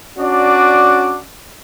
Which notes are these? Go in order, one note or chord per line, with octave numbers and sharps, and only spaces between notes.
C#4 D4 F#4 D5